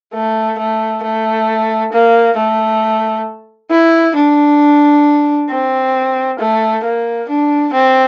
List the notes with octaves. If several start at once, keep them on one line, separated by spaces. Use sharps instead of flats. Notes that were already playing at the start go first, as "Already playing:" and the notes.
A3
A3
A3
A#3
A3
E4
D4
C4
A3
A#3
D4
C4